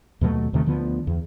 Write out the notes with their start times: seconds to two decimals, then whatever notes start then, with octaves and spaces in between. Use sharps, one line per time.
0.21 D#2 B2 F#3 A3
0.53 D#2 C3 D#3 A3
0.66 D2 D3 F3 B3
1.07 E2